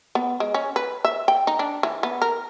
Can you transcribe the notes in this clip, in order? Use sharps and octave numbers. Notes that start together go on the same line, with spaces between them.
B3
G#3
C#4
B4
E5
G5
D#4
D4
E3
B3
A#4